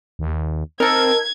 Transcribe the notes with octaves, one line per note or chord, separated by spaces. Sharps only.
D#2
C4 D#4 A4 A#4 G#6